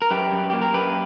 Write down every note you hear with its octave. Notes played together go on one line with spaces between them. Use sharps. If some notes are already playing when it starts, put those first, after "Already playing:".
A#4
F#2 G4 B4
F#2
A#3 G4
A#4
F#2 G4 B4